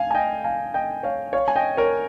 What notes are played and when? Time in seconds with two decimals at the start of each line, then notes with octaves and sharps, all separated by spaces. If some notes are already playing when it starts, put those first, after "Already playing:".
Already playing: F5 G#5
0.11 G#5
0.15 D#5 G5
0.44 F5 G#5
0.74 D#5 G5
1.03 C#5 F5
1.33 C#5 F5
1.48 G#5
1.56 D#5 G5
1.77 A#4 C#5